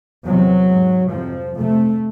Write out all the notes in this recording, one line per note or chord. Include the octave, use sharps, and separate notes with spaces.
E2 C3 F#3
G#2
F2 C3 F3
F2 C3 A3